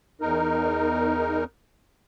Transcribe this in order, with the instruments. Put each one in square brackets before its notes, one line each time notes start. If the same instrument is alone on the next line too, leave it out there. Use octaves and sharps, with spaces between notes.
[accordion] E2 D#4 A#4